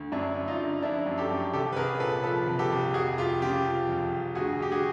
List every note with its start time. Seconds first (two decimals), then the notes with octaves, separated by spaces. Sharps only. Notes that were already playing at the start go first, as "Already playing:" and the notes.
Already playing: D2
0.12 F#2 D4 E4
0.35 F#2
0.48 D#4 F4
0.59 D3
0.82 F3 D4 E4
1.06 F#2
1.18 G4 A4
1.30 F#2
1.53 C2 G4 A4
1.72 B4
1.76 C2 G#4 A#4
2.00 A#2 A4 B4
2.23 F3 A4 B4
2.47 C2
2.59 G4 A4
2.72 C2
2.94 F2 F#4 G#4
3.18 F2 F4 G4
3.42 C#3 F4 G4
3.66 F3
3.89 F2
4.12 F2
4.35 D2 F#4 G#4
4.60 D2 G4
4.72 F#4 G#4